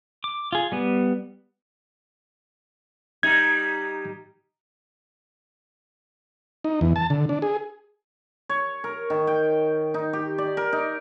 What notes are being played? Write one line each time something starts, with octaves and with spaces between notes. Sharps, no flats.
D6
F4 G#4
G3 B3
G3 D#4 G#6
D#4
E2
A5
D3
D4
G#4
C#5
A#4
D#3
G5
D#4
G4
D5
A#4
D#4